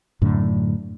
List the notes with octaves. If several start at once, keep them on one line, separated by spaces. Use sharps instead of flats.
F#2 A2 D3